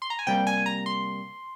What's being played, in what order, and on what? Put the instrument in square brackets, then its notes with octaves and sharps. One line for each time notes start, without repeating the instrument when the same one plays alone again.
[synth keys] C6
A#5
G#5
C3 G3 A#3 G5
G#5
A#5
C6